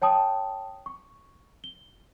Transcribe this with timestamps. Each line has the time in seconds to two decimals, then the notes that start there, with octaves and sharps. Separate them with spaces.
0.02 C#5 G5 A5 D#6
0.86 C#6
1.64 G7